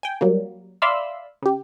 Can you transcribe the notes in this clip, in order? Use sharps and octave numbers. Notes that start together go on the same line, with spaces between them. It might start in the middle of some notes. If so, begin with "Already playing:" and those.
G5 G#5
F#3 G3 A#3
D5 E5 F5 B5 C6 E6
C#3 G4